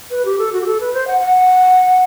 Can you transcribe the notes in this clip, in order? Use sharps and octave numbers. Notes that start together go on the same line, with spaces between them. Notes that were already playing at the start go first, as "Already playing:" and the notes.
B4
G4
A4
F#4
G4
A4
B4
C5
F#5
F#5